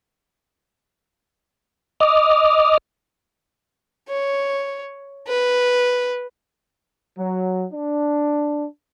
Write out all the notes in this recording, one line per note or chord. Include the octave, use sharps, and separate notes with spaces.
D#5 D6 D#6 F6
C#5
B4
F#3
D4